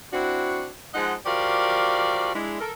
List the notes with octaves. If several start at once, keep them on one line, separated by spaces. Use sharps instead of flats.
C4 D4 E4 F#4
F3 G#3 D#4 D#5 F#5
F3 F#4 G4 A#4 D5 F5
G#3 D4 E4
A4 A#4